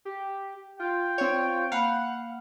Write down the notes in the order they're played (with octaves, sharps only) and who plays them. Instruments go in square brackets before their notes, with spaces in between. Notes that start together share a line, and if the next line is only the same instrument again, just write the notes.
[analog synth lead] G4
[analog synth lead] F4 [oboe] G5
[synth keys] C4 C#5 [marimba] D5
[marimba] A#3 B5 [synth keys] F5 [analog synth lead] F#5